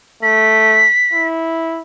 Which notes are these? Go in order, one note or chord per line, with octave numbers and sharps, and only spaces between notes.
A3 B6
E4